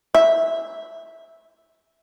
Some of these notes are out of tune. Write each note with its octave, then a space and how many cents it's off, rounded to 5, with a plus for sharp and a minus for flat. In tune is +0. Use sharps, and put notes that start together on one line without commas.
E5 -5